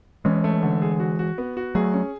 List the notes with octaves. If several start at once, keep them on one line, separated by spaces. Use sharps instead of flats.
E3 G#3 C#4
A3
D3
G#4
F#4
F#4
B3
F#4
F#3 A3 G#4
C#4